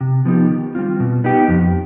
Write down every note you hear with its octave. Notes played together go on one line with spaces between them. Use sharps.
C3
F3 B3 D#4 G4
D#3
G3 C4 F4
B2
B3 D#4 G4
F2